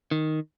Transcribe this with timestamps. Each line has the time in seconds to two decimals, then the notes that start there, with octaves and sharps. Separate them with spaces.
0.11 D#3